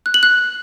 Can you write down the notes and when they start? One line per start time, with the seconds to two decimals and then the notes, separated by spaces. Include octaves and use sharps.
0.06 F#6
0.14 F#7
0.23 F#6